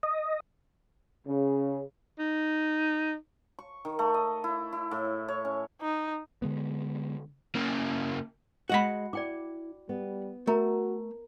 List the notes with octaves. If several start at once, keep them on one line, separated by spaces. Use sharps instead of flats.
D#5
C#3
D#4
C#6
D#3
A3
D#5
E4
E4
A2
C#5
C#4
D#4
D3 G#3 B3
C#3 A#3
G#3 F#4 D#5 F#5 B5
E4 D5 G5 D6
G3 B3
A3 F#4 A#4 A#5